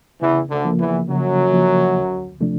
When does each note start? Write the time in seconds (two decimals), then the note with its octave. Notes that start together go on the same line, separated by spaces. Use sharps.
0.21 E2 C#3 E3
0.50 D2 D3
0.65 F3 A#3
0.80 E2 E3
1.09 F#2 C#3 F#3
1.52 F3 A#3
1.97 D2
2.41 C3 F3 A3 D4